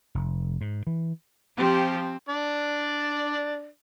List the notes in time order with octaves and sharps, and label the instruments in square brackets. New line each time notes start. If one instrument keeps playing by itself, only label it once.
[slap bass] F1
G#2
E3
[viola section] F3 G4 [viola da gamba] C4
[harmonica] D4 D5